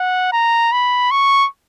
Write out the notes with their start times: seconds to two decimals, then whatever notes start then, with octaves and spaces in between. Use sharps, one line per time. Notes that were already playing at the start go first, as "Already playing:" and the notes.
Already playing: F#5
0.33 A#5
0.72 B5
1.11 C#6